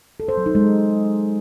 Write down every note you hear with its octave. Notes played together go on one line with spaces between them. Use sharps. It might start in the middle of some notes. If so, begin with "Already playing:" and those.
A4
C5
F#3
D#4
G#3